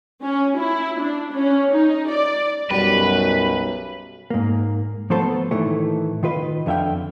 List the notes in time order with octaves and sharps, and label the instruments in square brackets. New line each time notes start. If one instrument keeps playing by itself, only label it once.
[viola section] C#4
E4
D4
C#4
D#4
D5
[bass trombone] B1 [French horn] F#2 [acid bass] G3 [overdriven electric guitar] B4
[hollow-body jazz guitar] G#2 A#3
F3 A3 B3 A4 C5 A5
A2 D#3 E3 A3
D#3 F4 B4 D#5
F2 D3 E5 F5 G5